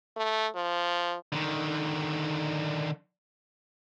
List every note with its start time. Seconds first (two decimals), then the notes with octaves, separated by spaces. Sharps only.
0.17 A3
0.55 F3
1.32 D3 D#3